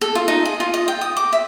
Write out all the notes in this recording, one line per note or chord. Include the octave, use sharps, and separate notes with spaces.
A4
F4
D#4
G#4
F4
D#5
G5
D#6
D6
E5